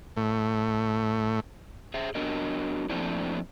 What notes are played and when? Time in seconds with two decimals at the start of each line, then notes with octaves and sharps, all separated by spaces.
0.17 A2
1.94 G#4 C5 E5
2.15 F#3 B3 D4 A#4 D#5
2.89 F3 A3 A#3 C4 D4 E4